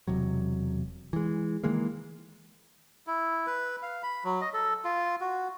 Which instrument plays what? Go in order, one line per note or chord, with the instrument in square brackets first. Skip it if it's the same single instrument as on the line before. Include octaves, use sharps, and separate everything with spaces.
[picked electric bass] E1 C3 F#3
E3 G#3
D#3 E3 G#3 A#3
[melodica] E4
B4
F5
B5
F#3
D#5
A4
F4
F#4